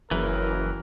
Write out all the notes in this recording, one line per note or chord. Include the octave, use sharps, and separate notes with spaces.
F#1 F#2 E3 A#4